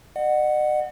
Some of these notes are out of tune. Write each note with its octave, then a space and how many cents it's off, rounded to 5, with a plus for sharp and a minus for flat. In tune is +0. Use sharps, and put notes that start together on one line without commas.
D#5 -45 F#5 +0